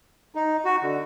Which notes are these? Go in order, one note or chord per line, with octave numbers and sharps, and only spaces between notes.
D#4
F#4
D3